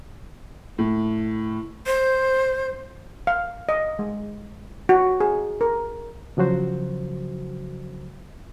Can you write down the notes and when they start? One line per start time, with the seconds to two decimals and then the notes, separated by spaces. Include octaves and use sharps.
0.78 A2
1.86 C5
3.27 F5
3.69 D#5
3.99 G#3
4.89 F#4
5.20 G#4
5.61 A#4
6.37 C#3 F3 F#3 F#4 C5